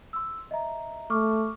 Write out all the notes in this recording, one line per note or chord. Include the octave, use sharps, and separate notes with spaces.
C6 E6
D#5 E5 A#5
A3 C#6 D6 F6